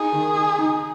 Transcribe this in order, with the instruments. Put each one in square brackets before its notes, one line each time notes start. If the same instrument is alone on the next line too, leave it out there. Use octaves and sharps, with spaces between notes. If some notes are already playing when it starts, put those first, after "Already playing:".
Already playing: [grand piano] D#4 [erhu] G#4
[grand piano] D#3
D#4
D#4